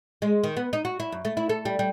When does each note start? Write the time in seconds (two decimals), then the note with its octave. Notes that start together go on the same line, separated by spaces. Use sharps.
0.22 G#3
0.44 D#3
0.57 B3
0.73 D#4
0.85 F#4
1.00 E4
1.12 F#2
1.25 A3
1.37 E4
1.49 A4
1.65 G3
1.79 G3